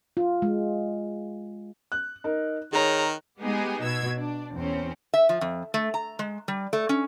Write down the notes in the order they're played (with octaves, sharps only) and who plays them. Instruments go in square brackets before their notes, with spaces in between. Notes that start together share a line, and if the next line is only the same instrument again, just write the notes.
[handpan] F4
G#3
[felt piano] F#6
D#4 A#4
[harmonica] D#3 [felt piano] G#4 C#5 [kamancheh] A#5
[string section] G#3 B3 D#4 G4 G#4
B2 E6 G#6
D4
E2 C4 C#4
[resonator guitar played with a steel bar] E5
F3
F2
A3
A#5
G#3
G3
A3
C#4